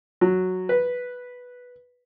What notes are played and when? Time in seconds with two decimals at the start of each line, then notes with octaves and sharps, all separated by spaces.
0.21 F#3
0.69 B4